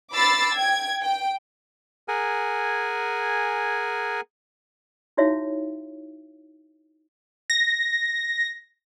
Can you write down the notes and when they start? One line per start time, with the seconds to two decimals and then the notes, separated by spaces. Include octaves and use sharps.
0.12 B5 D6 E6 A6 C7
0.53 G5 G#6
1.02 G5
2.08 G#4 A#4 F#5 G#5
5.17 D#4 E4 F#4 C#5 E5 F5
7.50 A#6